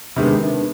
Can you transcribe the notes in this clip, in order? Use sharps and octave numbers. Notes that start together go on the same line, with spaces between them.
C3 D#3 G#3 B3 D4
D4